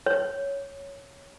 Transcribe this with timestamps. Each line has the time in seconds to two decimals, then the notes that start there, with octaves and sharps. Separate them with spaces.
0.06 C#5